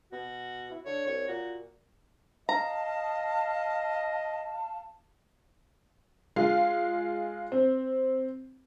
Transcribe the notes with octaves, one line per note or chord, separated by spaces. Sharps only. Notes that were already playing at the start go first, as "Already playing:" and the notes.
B2 F#4
E4
D3 C#5
C2 C#5
A#2 F#4
D#5 F5 A5 A#5
G#3 F4 F5
C4